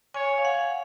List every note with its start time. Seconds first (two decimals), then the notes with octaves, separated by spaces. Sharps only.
0.14 C#5 G#5
0.38 F5
0.45 F#5